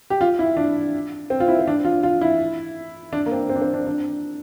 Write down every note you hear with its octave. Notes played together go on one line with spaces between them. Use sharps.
G4
F4
E4
D4
C4
F4
E4
C4
D4
F4
F4
E4
D4
A#3
C4
C4
D4
C4
D4
D4